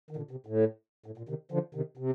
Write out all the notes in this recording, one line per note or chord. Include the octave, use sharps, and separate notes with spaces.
D#3
A#2 D3
C3
A2
A2
A#2
C3 D#3
D3 F3
C3 D#3
C3